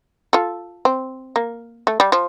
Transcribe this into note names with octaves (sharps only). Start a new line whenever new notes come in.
F4 A4
C4
A#3
A3
G3
F3